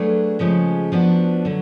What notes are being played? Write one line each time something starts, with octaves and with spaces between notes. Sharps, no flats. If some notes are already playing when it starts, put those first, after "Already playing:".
Already playing: F#3 A3 D4 G#4 B4
C#3 F3 G#3 C#4
F3 B3 D4 F#4
D3 F#3